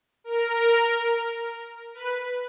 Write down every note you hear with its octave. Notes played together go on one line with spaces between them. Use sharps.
A#4
B4